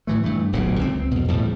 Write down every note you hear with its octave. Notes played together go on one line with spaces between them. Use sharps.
A2 E3 A3
G2 E3 A3
D1 B1 A#2 C#3
C#2 C4
F2 B2
E2 A2 C3 G3